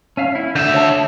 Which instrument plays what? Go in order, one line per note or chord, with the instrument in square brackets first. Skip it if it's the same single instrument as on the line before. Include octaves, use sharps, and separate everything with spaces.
[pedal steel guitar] C#4 E5 F5
E4
[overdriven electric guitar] D3 E5 [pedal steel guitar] G6
[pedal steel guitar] C#5 A5